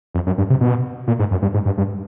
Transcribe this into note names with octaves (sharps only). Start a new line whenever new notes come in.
F2
F#2
G2
C3
B2
A#2
G#2
F#2
G2
G#2
G2
G2